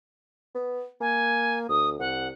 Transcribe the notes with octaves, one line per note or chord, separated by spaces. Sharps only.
B3
A#3 G#5
D2 D#6
C2 F#5